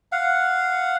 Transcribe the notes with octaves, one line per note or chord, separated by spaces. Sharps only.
F5 F#5